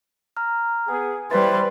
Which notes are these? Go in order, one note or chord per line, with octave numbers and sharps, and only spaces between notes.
A#5 F6
B3 G#4 G#5
G3 E4 B4 C5 A6